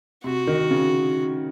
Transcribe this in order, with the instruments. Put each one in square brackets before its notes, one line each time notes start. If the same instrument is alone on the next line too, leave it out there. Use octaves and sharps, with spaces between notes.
[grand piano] C3 [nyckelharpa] F#4
[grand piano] D#3
C#3